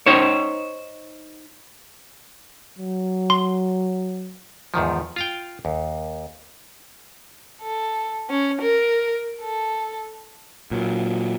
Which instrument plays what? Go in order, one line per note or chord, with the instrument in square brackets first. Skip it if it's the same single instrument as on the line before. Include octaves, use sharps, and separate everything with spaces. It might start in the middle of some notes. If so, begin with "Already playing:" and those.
[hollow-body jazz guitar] D#4 C5 C#5
[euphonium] F#3
[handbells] C6
[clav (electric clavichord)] E2 G#2 D#3 F3
F4 F5 G5
D#2
[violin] A4
C#4
A#4
A4
[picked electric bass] A#2 F#3